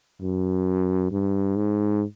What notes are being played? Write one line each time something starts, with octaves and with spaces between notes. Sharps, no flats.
F#2
G2
G#2